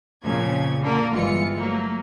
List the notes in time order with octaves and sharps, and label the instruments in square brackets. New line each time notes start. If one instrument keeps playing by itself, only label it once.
[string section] F2 A#2 C#3 F3 G#6
D3 A#3 A#4
G1 E3 G#3 F4 C#7
F#3 A3 A#3